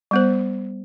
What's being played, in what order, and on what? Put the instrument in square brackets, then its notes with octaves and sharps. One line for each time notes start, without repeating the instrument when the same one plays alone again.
[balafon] G3 B3 C5